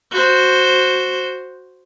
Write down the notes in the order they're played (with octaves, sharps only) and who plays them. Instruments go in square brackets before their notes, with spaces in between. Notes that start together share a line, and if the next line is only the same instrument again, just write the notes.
[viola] F#4 C5